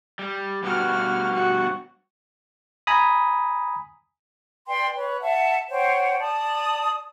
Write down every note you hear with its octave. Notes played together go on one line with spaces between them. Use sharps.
G3
G2 B2 G3 F#4 F6
F#4
G#5 A#5 B5 D#6
B4 D5 G5 C6
B4 C#5
E5 F#5 A5
C5 C#5 F#5 G5
D5 A5 D#6